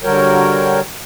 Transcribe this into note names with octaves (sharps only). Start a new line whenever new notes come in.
D3 G3 F#4 A#4 C#5 G5